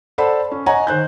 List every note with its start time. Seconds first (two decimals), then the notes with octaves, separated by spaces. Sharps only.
0.18 A4 C5 D5 F#5 A5 B5
0.51 C#4
0.66 C#5 D#5 F#5 G#5 A#5
0.87 D#3 C5 F#6 G6